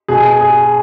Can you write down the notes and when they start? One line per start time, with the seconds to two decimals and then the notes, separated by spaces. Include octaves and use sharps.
0.08 B2 G#4
0.41 G#4